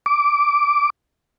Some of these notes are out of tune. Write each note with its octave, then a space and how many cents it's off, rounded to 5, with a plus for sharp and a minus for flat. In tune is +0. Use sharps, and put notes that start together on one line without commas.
D6 -10